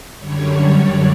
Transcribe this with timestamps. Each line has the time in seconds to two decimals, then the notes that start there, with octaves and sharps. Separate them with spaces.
0.20 F#2 D3 G3 C#5
0.76 D5